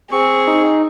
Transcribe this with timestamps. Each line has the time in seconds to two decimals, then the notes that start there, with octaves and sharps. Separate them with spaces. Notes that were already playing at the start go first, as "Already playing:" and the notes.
0.12 C4 G#4 C#6
0.47 D#4